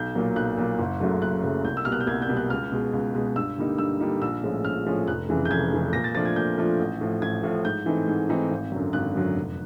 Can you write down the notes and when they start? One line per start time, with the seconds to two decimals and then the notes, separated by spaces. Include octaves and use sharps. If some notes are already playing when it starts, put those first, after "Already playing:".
Already playing: B1 G6
0.15 A#2 F#3 A#3
0.36 B1 F#6
0.57 A#2 F#3 A#3
0.79 F#1
1.00 F#2 C#3 F#3 A3
1.22 F#1 F#6
1.43 F#2 C#3 F#3 A3
1.65 C2 G6
1.77 E6
1.85 B2 G3 A#3 F6
1.92 F#6
2.01 G6
2.07 C2 G#6
2.22 G6
2.29 B2 G3 A#3
2.37 F#6
2.50 C#2 F6
2.72 B2 G#3
2.93 C#2
3.15 B2 G#3
3.36 G2 E6
3.58 D3 G3 A#3 D#4
3.78 G2 E6
4.01 D3 G3 A#3 D#4
4.22 A#1 E6
4.43 A2 F3 G#3 C#4
4.65 A#1 F6
4.86 A2 F3 G#3 C#4
5.08 F1 F#6
5.29 F2 C#3 E3 G#3
5.45 G6
5.51 F1 G#6
5.72 F2 C#3 E3 G#3
5.93 A#2 A#6
6.04 A6
6.15 F3 A3 D4 F4 A6
6.25 G#6
6.36 A#2 G6
6.58 F3 A3 D4 F4
6.80 A1
7.01 A2 F3
7.22 A1 G#6
7.43 A2 F3
7.65 G#2 G6
7.86 E3 A3 C4 D#4
8.08 G#2
8.29 E3 A3 C4 D#4
8.50 G#1
8.72 F#2 D3 F#3
8.93 G#1 F#6
9.15 F#2 D3 F#3
9.36 F1